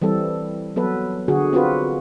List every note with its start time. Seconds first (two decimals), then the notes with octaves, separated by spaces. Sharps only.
0.02 E3 G3 C4 A4
0.76 F#3 B3 A4 B4
1.28 D3 F#4 G#4
1.53 C4 F4 F#4 B4